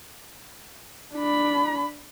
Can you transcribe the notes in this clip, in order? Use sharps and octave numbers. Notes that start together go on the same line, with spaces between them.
D4 B5